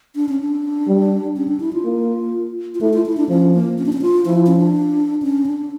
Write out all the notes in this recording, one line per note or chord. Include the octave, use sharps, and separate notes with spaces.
D4
C#4
D4
G3
C#4
D4
E4
F4
A#3
F4
A3 E4
F4
E4
D4
F3 C#4
A#3
C#4
D4
C#4
F4
F3 E4
C#4
D4
C#4
D4